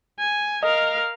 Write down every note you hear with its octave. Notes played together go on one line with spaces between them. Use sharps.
G#5
A#4 D#5 F5